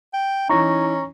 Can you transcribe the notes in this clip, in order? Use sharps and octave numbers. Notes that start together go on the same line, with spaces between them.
G5
E3 C#4 D#4 A#5 C#6 A#6